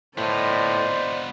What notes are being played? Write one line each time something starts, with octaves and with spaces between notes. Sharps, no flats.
A2 B3 F4 C5 D5 D#5